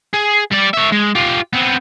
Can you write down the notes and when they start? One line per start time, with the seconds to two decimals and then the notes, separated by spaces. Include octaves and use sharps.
0.14 G#4
0.52 G3 D5
0.74 C#5 E5
0.92 G#3
1.15 F4 G4
1.53 B3 C4